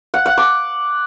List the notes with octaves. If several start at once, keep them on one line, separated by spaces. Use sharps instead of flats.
F#5
F#5
D6